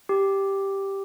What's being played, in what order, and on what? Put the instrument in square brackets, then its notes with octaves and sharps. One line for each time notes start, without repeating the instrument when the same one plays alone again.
[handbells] G4